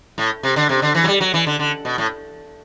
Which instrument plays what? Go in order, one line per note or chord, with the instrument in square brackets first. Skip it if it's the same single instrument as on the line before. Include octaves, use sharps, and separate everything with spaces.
[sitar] A2
C3
D3
C3
D3
E3
F#3
G3
F#3
E3
D3
D3
B2
A2